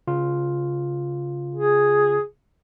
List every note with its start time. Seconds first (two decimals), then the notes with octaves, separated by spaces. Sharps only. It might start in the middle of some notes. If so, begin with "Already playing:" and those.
0.07 C#3 F4
1.55 G#4